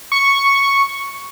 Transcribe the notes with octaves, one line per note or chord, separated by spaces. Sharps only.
C#6